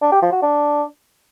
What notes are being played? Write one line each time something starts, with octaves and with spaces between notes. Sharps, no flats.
D4
G4
F3
F#4
D4